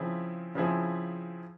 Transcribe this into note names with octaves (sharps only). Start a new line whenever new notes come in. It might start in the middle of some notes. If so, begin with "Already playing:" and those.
Already playing: C#3 F3 C4 E4 G#4
C#3 F3 C4 E4 G#4